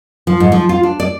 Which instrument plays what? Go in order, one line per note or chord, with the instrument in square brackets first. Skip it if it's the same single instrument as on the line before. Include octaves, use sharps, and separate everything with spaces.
[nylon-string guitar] F3
G#2
F3
F4
D4
D5